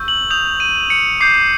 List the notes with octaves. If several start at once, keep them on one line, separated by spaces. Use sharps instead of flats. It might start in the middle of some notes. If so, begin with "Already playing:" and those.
Already playing: C#6 E6 G6
F#7
D#6 G6 F7
D#7
C#7
D6 G6 C7